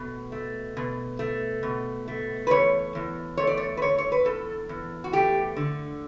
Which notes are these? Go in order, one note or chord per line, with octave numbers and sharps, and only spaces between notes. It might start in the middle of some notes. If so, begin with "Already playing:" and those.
Already playing: B2 A3
A3
B2
A3
B2
A3
B4
E2 C#5
E2
A3 C#5
D5
C#5
B4
D3 C#5
C#5
B4
E2 A4
E2
F#4
A3 G4
D3